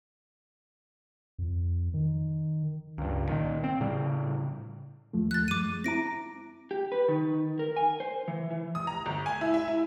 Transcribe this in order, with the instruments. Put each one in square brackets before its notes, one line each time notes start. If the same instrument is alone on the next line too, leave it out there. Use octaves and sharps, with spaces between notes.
[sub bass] F2
D#3
[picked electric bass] C#2 G2
A#2 D#3
C4
A2 C#3 G3
[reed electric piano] D#2 F3 A3
[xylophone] F#6 A6
[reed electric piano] F#2 G#3 [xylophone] D6 D#7
[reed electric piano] C4 E4 A#5 [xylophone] A#6 D7
[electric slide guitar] G4
B4
D#3
A#4
G#5
C5
E3
E3
[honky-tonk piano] D#6
A#5
G1
G#5
E4
E5
E4